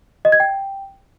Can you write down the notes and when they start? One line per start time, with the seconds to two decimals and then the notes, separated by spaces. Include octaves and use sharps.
0.25 D#5
0.32 G#6
0.40 G5